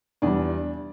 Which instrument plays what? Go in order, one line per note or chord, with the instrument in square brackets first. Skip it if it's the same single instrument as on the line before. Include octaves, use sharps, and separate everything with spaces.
[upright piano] E2 E3 G3 D4